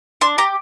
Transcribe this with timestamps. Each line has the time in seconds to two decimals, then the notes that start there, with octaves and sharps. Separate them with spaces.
0.21 D4 C6
0.38 G4 A#5